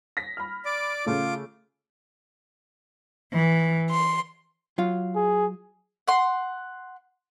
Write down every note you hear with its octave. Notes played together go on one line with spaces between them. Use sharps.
A#6 B6
B5 F6
D5 D6
C#3 A3 F4 D6
E3
C6
F#3 F4 F5
G#4
F#5 C6